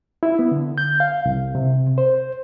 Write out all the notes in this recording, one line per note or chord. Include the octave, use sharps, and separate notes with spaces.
E4
B3
D3
G6
F5
C2
C3
C5